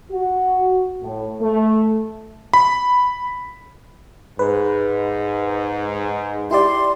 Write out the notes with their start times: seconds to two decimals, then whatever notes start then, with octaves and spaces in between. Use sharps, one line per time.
0.11 F#4
1.02 A2
1.40 A3
2.54 B5
4.39 G#2 B4
6.51 E4 G4 D5 C6